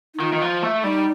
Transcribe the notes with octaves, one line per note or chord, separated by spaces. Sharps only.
D#4
D#3 F4
D#3
F3
A3
G3 D#4